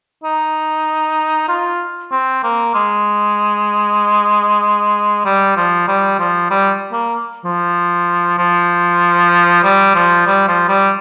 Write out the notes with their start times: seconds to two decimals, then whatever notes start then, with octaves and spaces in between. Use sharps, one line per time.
0.24 D#4
1.48 F4
2.12 C4
2.43 A#3
2.75 G#3
5.25 G3
5.57 F3
5.88 G3
6.19 F3
6.50 G3
6.92 A#3
7.45 F3
8.38 F3
9.64 G3
9.95 F3
10.27 G3
10.48 F3
10.69 G3